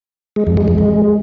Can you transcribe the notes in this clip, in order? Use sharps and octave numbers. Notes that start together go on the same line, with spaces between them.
G#3
F2
G#3
F2
G#3